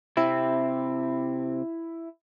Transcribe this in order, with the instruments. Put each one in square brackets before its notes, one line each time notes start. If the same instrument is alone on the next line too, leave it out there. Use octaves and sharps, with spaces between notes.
[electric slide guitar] C3 C4 [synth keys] E4